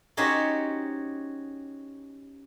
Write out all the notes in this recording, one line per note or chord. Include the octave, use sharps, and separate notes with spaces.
C#4 D#4 F#4 G4 C5 C#5